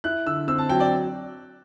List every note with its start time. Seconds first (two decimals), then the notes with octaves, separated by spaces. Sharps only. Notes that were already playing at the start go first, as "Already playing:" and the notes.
0.04 E4 F#6
0.26 D3 E6
0.48 C4 E6
0.58 A5
0.69 F#3 G5
0.80 D5